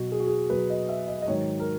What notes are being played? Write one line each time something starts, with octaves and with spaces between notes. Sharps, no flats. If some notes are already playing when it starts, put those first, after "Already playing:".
Already playing: B2 F#3 F#4
G#4
F#4
G#4
B2 F#3 B4
D#5
E5
D#5
D#5
G#2 D#3 F#3 C#5
A#4